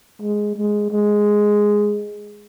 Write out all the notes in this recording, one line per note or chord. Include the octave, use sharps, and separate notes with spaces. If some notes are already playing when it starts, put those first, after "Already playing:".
G#3
G#3
G#3